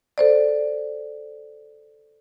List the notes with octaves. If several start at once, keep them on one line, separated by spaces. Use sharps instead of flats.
A4 C5 D5